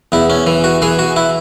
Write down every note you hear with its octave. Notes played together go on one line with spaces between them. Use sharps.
E2 E4
C#4
E3
F#4
E3 G#4
F#4
E4